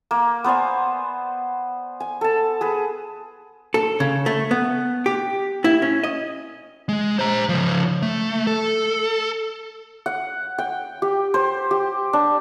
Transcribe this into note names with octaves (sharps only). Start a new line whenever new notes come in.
A#3
B3 C5 D5 G#5
G#5
A4 A5
G#4 B4
A4
C#3
A3
B3
G4
E4
C#4
D#5
G#3
C5 A#5
C#3 F3
A3
A4
F#5
G5
G4
C5
G4
D4